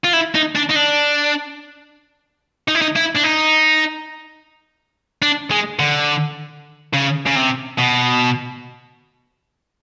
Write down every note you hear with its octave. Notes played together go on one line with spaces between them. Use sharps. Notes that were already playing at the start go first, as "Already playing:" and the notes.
F4
E4
D#4
D4
D#4
D4
D#4
E4
D#4
E4
D4
D#4
D4
G#3
D3
C#3
C#3
C3
B2